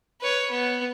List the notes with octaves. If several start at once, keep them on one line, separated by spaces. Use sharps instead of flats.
B4 C#5
B3